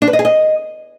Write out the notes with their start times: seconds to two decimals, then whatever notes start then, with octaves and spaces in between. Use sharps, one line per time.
0.02 D4
0.07 B4
0.13 D#5
0.19 G#4
0.25 D#5